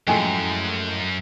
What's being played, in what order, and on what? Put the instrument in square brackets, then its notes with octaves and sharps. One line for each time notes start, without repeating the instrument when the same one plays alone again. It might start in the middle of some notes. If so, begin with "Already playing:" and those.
[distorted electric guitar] F#2 [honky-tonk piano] A2 F3 G#3 [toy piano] G5 G#5 A#5